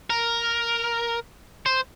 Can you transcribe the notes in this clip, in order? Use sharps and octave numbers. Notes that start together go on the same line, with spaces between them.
A#4
C5